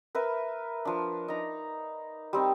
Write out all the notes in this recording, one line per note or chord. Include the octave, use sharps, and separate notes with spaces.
A#4 B4 E5
F3 D4
D#4 A#5
G3 C4 D#4